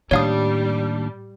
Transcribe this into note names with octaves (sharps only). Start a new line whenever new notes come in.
D#2 A2 G3 D4 C#5 F5 D#6